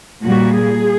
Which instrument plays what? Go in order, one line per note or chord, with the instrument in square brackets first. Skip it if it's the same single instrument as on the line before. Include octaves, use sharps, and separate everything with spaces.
[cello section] A#2 G3 A#3 F#4
G#4